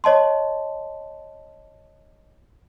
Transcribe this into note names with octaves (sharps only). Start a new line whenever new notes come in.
C#5 D#5 A5 C6